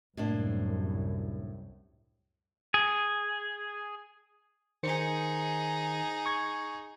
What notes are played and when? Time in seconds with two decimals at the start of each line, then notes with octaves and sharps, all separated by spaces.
0.17 C2 F#2 A2 A#3 D4
2.74 G#4
4.83 D#3 D#4 G#4 C5 C#7
6.26 C#6 G#6